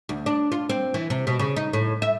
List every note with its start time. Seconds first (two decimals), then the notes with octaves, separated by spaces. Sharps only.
0.09 D2
0.26 D4
0.52 F4
0.69 C4
0.94 E3
1.10 C3
1.27 B2
1.39 C#3
1.56 D#4
1.73 A2
2.02 E5